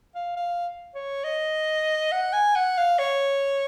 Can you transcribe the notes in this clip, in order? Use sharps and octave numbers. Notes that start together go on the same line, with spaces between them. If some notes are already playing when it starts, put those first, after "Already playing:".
F5
F5
C#5
D#5
F#5
G#5
F#5
F5
C#5